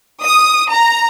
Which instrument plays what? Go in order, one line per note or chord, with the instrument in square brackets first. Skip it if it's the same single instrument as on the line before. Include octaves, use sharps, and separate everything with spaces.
[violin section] D#6
A#5